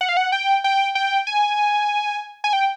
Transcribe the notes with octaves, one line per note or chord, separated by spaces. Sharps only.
F#5
F5
F#5
G5
G5
G5
G#5
G#5
G5